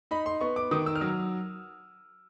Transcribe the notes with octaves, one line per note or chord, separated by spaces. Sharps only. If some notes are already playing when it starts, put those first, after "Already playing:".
D#4 B5
C6
B3 C#6
D6
D#3 D#6
E6
F6
F#3 E6